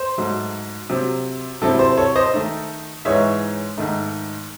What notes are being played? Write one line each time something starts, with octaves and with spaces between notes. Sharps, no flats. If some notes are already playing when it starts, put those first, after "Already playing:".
Already playing: C5
G#2 F#3 A3
C3 F#3 C4
C3 F#3 C4 E4 A4
C5
A4 C#5
C5 D#5
D#3 A3 D#4
G#2 E3 G#3 D#4 C#5 E5
G#2 D#3 A3 D#4